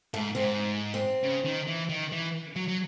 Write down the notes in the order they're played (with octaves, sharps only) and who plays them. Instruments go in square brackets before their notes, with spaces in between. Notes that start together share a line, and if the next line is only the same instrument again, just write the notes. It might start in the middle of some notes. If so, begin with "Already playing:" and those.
[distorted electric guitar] G#2 [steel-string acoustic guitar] A3
[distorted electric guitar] G#2 [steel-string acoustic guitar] C4
[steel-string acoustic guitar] C4
[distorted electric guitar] C#3
D#3
E3
D#3
E3
F#3
F#3